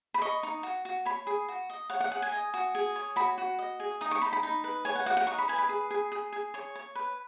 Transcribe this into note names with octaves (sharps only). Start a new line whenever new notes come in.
B5
D#5 C#6
D#4
F#4
F#4
C#5 B5
G#4
F#4
D#5
C#5 F#5
F#5
G#4 F#5
G#5
D#5
F#4
G#4
C#5
F#4 B5
F#4
D#5
G#4
D#4 D#6
C#6
D#4 B5
B5
D#4
B4
C#5 G#5
F#5
F#4 F#5
F#5
D#4 C#6
B5
B4 G#5
B5
G#4
G#4
G#4
G#4
C#5 C#6
C#5
B4